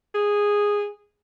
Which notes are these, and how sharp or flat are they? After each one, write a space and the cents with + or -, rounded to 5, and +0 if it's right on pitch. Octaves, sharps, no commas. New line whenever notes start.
G#4 -10